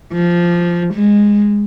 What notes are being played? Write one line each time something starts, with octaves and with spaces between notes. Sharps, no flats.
F3
G#3